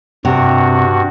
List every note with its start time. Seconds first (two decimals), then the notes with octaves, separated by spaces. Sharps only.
0.25 G2 C3 F#4